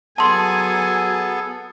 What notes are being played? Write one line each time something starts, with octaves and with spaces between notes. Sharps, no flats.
F#3 B3 G#4 A4 G#5 A5 C6